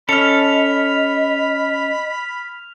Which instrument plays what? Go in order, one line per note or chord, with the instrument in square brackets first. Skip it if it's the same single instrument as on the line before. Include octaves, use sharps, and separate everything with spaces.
[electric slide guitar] C#4 A4 [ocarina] D#5 [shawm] B5 [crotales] F6 F7